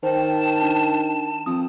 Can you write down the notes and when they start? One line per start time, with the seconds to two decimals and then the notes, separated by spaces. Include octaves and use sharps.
0.03 D#3 C5 G5 A5
0.62 D4
1.46 F2 D#6